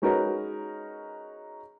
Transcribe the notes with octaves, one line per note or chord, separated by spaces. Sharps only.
G#3 C#4 D#4 F#4 A#4 B4